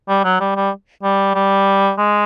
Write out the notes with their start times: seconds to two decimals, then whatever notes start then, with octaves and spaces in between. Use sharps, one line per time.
0.09 G3
0.24 F#3
0.40 G3
0.56 G3
1.03 G3
1.35 G3
1.98 G#3